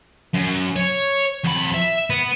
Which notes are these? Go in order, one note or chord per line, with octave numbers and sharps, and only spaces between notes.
F#2
C#5
F2 B5
E5
B3